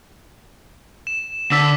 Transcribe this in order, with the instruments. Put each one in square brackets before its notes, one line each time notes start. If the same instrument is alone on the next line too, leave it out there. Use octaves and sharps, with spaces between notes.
[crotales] E7
[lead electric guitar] D3 [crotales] D6 E6 B6